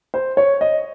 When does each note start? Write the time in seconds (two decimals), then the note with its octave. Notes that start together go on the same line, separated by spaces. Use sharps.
0.14 C5
0.37 C#5
0.61 D#5